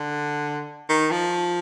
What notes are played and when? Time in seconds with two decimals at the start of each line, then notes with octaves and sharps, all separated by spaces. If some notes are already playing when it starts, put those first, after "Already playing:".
Already playing: D3
0.89 D#3
1.11 F3